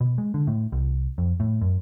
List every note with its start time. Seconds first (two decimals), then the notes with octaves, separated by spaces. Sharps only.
0.01 B2
0.18 G#3
0.34 D3
0.47 A2
0.72 C2
1.18 F2
1.40 A2
1.62 F#2